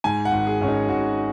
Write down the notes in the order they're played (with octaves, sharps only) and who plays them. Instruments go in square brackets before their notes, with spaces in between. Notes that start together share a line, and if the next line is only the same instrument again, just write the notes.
[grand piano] G#2 G#5
F#5
G#1
G#4
G#1 C#4
D#4
G#1 F#4